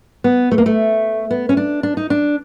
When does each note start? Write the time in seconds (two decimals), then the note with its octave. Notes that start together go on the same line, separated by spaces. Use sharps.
0.24 B3
0.51 A3
0.58 A#3
0.66 A3
1.31 B3
1.49 C#4
1.57 D4
1.83 D4
1.97 D#4
2.10 D4